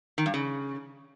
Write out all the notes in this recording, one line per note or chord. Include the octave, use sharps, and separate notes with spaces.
D#3
G2
C#3